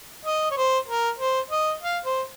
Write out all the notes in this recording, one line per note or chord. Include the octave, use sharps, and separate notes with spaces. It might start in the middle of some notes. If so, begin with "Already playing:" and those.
D#5
C#5
C5
A#4
C5
D#5
F5
C5